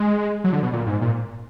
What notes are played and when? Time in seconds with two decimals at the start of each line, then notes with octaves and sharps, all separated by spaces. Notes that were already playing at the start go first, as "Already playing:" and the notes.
Already playing: G#3
0.44 F#3
0.53 D3
0.63 B2
0.73 A#2
0.87 G#2
1.01 A#2